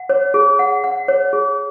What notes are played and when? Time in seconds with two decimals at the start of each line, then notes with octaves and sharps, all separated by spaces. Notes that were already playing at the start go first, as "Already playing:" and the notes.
Already playing: F#5
0.09 C#5
0.34 G#4
0.59 F#5
0.84 F#5
1.08 C#5
1.33 G#4